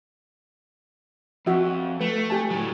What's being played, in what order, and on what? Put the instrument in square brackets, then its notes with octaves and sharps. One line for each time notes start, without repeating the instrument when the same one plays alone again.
[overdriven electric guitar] F2 [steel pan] F#4 E5
[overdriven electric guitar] A3 [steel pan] B4
[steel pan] G4 G#5 A5
[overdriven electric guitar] A2 F#3